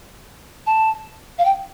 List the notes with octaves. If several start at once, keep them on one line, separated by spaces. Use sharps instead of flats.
A5
F5
G5